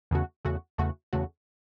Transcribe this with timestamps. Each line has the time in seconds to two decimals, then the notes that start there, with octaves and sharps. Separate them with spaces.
0.11 E2 C#3 A3 F#4
0.45 E2 C#3 A3 F#4
0.78 E2 C#3 A3 F#4
1.13 E2 C#3 A3 F#4